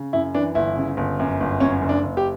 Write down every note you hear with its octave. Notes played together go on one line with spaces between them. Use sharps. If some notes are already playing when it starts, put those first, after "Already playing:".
Already playing: C#3
F#2 E4
E3 D4
G1 E4
C#3
G1
F#2
G1
F#2 C#4
F#1
D4
F#1
G4